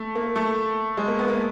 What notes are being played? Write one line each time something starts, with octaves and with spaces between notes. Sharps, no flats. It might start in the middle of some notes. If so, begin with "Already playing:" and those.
Already playing: A3
A#3
A3
G#3
A#3
B3
A#3